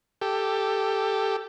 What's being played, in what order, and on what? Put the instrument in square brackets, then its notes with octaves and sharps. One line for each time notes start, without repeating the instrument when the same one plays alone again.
[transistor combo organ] G4 A4